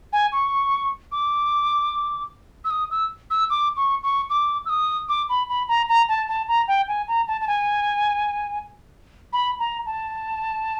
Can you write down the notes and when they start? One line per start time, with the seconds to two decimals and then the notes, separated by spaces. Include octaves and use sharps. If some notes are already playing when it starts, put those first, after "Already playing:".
0.13 G#5
0.32 C#6
1.12 D6
2.65 E6
2.70 D#6
2.91 E6
3.30 E6
3.50 D6
3.77 C#6
4.03 C#6
4.30 D6
4.65 E6
4.69 D#6
5.09 D6
5.29 B5
5.49 B5
5.68 A#5
5.89 A#5
6.09 A5
6.28 A5
6.48 A#5
6.68 G5
6.88 G#5
7.08 A#5
7.28 A5
7.41 A5
7.47 G#5
9.33 B5
9.59 A#5
9.86 A5